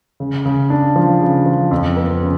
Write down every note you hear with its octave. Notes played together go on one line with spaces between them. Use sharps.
C#3
C#3
D4
F3
C#3
F3
F2
B3
C#3